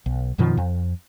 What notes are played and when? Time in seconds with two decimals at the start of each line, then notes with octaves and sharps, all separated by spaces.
0.06 B1
0.38 F#2 B2 D#3 F3
0.57 F2